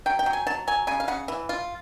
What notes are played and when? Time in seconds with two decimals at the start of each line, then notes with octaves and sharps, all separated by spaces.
0.06 F#3 G5
0.19 G5
0.26 F#3
0.33 G#5
0.47 F#3 A5
0.67 F#3 G#5
0.87 C#3 G#5
1.00 F5
1.08 C#3 F#5
1.28 E3
1.49 F4